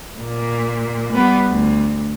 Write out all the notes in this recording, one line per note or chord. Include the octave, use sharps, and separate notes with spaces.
A#2
G3 B3
D2